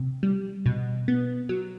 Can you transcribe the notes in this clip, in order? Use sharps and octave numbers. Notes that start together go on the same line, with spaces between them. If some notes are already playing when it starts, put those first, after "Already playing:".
Already playing: C3
G3
B2
B3
F#3